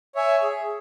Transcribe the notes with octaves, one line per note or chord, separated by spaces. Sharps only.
C#5 E5 G#5
G#4